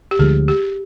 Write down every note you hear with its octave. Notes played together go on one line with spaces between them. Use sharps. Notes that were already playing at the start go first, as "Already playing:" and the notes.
G4
D2 D3 F3 G#3 G#4
G4